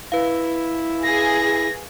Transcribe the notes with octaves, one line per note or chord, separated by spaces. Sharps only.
E4 B4 F5
G#4 A#6